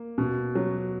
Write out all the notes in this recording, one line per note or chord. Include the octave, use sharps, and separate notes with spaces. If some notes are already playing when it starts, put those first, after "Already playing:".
Already playing: A#3
B2
F#3